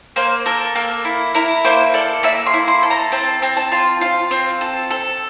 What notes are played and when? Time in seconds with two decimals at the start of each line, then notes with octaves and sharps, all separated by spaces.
0.16 A#3 C5
0.46 A4 A#4
0.75 A#3
1.05 E4
1.34 E4 A#4
1.65 A#3 C5
1.94 A4 D5
2.23 A#3 E5
2.46 C6
2.54 E4
2.68 C6
2.83 A4
2.90 A#5
3.12 C4 A5
3.42 C4
3.57 A5
3.72 F4
4.01 F4
4.31 C4
4.61 A4
4.91 A4